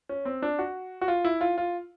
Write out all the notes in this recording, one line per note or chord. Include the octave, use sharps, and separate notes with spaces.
C#4
C4
D4
F#4
F#4
F4
E4
F4
F4